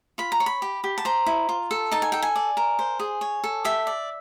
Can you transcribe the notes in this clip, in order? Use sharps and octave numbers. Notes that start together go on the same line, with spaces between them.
F4 B5
A#5
C#5
B5
G4
G4
A5
C5 A#5
E4
F4
A4
D#4 A5
G#5
A4 G5
G#5
D5
A#4
C5
G#4
C#5
A4
G4 E5
D5